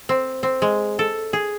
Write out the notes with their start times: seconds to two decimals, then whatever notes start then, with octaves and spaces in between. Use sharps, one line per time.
0.09 C4
0.43 C4
0.62 G#3
0.99 A4
1.33 G#4